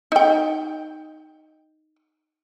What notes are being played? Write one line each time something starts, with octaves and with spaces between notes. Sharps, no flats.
D#4 G5